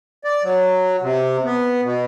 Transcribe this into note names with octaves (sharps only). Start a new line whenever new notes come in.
D5
F#3
C3
B3
B2